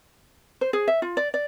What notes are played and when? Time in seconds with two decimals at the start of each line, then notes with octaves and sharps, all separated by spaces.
0.61 C5
0.73 G#4
0.88 E5
1.02 F4
1.17 D5
1.34 D5